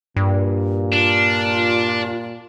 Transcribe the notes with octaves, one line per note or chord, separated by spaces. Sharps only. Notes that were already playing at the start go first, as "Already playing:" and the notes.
G2 A#2
D4 F4